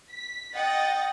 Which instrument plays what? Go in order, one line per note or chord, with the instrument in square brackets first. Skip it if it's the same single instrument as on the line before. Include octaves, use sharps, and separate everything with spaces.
[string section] B6
[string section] D#5 F#5 A6 [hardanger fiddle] G5